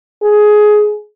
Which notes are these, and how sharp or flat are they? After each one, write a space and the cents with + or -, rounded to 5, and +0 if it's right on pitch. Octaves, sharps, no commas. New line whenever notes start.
G#4 +15